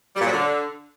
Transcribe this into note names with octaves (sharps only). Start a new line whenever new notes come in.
G3
A#2
F#3
D3